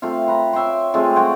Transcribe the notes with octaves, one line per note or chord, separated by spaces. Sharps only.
A3 C4 F4 F5
B4 A#5
C#5 E5 G5 C6
G#3 A3 C4 F4
C4 C#5 F#5 G5